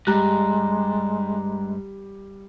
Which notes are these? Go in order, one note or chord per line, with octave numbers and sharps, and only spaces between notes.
G2 G3 G#3 A#5 F#6